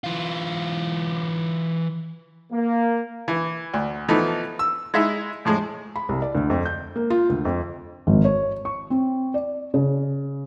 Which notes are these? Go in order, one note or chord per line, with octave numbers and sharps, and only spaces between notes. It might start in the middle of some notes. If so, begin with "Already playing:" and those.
E3 F4
A#3
E3
D2
E3 F3 A3 B3 D#4
E6
G#3 D#4 E4 E5
F2 A2 G#3
B5
C2
D5
D2
F2
G6
A#3
F4
D2
F2
G#1
C#5
C#6
C4
D5
C#3